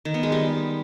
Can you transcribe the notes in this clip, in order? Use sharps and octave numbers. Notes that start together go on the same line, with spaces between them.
D#3
B3
G#3
G3